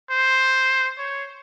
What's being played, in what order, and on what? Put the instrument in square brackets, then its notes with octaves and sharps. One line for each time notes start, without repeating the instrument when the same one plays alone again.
[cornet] C5
C#5